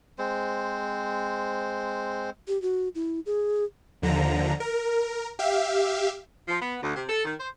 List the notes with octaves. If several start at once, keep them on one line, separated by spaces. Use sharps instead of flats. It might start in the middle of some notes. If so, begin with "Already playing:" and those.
G#3 C4 C5
G4
F#4
E4
G#4
D#2 D3 F3 A#5
A#4
G4 E5 F5
F3
B3
D2
C3
A4
D#3
C5